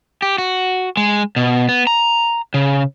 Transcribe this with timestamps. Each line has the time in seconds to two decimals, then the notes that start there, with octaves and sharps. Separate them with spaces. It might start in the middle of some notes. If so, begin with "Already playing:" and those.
0.22 G4
0.38 F#4
0.97 G#3
1.36 B2
1.69 B3
1.87 A#5
2.54 C#3